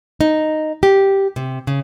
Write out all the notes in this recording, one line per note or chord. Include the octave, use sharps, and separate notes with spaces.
D#4
G4
C3
C#3